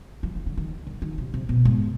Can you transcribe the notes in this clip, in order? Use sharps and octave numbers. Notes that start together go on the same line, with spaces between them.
F3
D#3
D3
D#3
D#3
D#3
C3
C3
B2
G#2